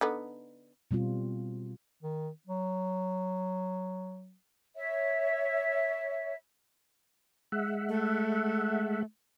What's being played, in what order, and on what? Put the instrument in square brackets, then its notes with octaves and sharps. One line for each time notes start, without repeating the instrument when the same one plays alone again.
[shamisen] D3 B3 D#4
[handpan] B2 G3 C4 F4
[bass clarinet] D#3
F#3
[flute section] C#5 E5
[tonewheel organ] G#3 E5 F#5
[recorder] A3